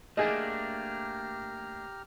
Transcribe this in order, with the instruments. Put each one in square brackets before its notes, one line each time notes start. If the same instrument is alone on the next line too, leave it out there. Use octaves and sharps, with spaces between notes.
[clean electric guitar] A3 A#3 D4 [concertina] G4 A#5 F6 [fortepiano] G#4 D#5